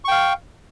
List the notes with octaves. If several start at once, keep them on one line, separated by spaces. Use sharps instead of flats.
F5 G5 C#6